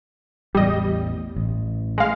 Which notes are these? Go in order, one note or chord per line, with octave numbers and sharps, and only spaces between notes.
A1 E2 G3 D#5
A1
G#3 F5